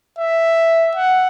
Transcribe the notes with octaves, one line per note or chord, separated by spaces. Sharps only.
E5
F#5